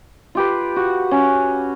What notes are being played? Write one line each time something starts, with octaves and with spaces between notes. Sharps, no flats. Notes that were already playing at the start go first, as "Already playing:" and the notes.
F4 G4 B4
F#4
C#4